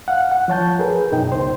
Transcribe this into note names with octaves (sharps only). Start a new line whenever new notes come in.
F5 F#5
F#5
F3 C#5 A5 G6
G#4 A#4 B4
F#2 B2 D#4 G5
C#2 C5